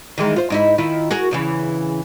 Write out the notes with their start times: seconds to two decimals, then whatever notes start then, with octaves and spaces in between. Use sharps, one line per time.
0.18 D#3 E3 G#3
0.36 F4 C5
0.50 G#2 D#4 E4
0.78 D#3 E4 F4
1.11 F#4 G#4 A#4
1.31 E2 C#3 E3